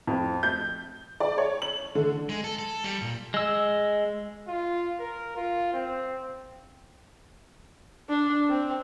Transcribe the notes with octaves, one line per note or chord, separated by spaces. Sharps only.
F2
G6
D5
C#5
F#7
D3
G#3
A4
A4
G3
A#2
G#3 E6
F4
A#4
F4
C4
D4
C4